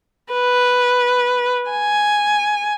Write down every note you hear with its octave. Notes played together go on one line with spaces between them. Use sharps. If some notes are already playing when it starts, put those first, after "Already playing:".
B4
G#5